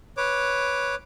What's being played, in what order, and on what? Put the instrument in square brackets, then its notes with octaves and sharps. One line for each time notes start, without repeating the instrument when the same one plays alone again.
[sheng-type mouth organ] B4 C#5 D6